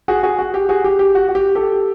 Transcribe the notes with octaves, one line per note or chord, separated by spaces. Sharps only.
F#4 G#4
F#4 G#4
F#4
G4
F#4 G#4
G4
G4
F#4
F#4
G4
G4 A4